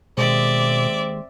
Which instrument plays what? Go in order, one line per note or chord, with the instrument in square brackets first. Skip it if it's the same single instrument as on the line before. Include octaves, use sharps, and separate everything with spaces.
[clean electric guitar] D#2 G#3 [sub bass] B2 [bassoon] C4 [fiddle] D5 E5